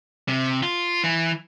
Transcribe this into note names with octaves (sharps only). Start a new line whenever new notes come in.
C3
F4
E3